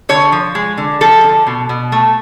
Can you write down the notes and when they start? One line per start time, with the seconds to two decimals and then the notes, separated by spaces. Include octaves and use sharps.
0.09 D3 C#5
0.32 F3
0.55 G#3
0.78 D3
1.01 F3 A4
1.24 D3
1.47 B2
1.69 B2
1.92 A3